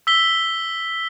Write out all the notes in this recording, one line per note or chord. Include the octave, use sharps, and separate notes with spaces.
E6 B6 G7